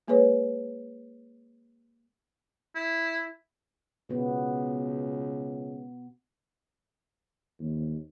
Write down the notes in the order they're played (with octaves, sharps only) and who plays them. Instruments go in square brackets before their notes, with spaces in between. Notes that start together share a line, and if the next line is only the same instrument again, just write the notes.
[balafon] G#3 A#3 G#4 B4 C#5
[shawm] E4
[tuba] C#2 [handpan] B2 B3
[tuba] D#2